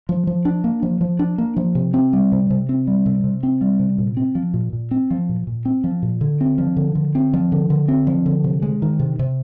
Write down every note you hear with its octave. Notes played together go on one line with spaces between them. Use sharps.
F3
F3
D4
A#3
F3
F3
D4
A#3
F3
C3
C4
G3
C3
C3
C4
G3
C3
C3
C4
G3
C3
A#2
C4
F3
A#2
A#2
C4
F3
A#2
A#2
C4
F3
A#2
D3
C4
F3
D3
D3
C4
F3
D3
D3
C4
F3
D3
C3
G#3
D#3
C3
C3